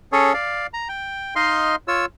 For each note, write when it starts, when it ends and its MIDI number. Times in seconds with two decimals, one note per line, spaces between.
0.12 0.33 61
0.12 0.33 68
0.12 0.33 69
0.12 0.33 73
0.34 0.67 74
0.34 0.67 77
0.74 0.88 82
0.89 1.34 79
1.36 1.76 63
1.36 1.76 75
1.36 1.76 77
1.36 1.76 84
1.88 2.06 65
1.88 2.06 73
1.88 2.06 88